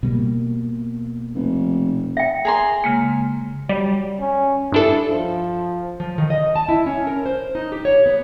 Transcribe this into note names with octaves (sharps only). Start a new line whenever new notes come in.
B2 G3 A#3
F1
E5 G5
G#4 A#5 C6
C#3 G#3 A#3
F#3 G3
C#4
G2 D4 E4 A4
F3
F3
D#3
D#5
A5
E4
C#4
A#4
C5
D#4
G4
C#5
B3